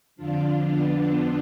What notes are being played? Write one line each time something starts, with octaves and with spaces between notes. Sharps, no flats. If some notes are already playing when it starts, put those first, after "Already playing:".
F2 D3 F3 D4 F4
B3 D4